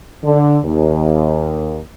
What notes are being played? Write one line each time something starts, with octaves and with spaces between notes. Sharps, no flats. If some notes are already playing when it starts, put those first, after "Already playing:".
D3
D#2